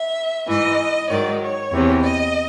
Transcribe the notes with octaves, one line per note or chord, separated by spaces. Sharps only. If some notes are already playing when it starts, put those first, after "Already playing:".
Already playing: E5
G#2 E3 D#5
G#2 D#3 F#3 D5
C#5
E2 C3 E3
D#5